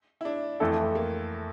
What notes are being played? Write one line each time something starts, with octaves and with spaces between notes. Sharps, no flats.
E4
D4
F2 E3 A3 E4 A4
A#3